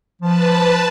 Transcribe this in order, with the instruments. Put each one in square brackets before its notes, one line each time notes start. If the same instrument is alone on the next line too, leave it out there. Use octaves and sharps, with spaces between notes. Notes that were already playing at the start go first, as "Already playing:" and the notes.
[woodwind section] F3 [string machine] B4 A5